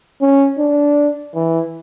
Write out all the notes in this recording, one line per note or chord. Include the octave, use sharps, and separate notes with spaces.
C#4
D4
E3